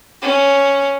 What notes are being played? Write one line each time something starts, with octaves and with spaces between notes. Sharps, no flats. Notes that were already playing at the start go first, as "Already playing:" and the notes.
C#4